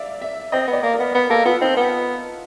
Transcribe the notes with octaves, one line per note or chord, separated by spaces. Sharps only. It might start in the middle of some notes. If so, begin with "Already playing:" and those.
Already playing: D5 E5 F5
E5
C4 D#5
B3
D5
A#3
A#4
B3
B3 B4
A#3 A4
B3 F4
C4 D#4
B3